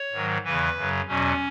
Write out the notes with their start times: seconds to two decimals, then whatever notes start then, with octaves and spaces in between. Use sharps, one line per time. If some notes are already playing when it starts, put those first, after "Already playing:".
Already playing: C#5
0.12 G#2 D#3 F#3
0.44 E2 C#3 E3 B4
0.76 F#2 C#3 F#3
1.08 E2 B2 F#3 C#4